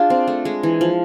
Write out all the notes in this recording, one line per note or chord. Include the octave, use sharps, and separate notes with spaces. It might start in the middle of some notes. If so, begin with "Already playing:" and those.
Already playing: D4 F4 G#4
C4
A3
G#3
E3
F3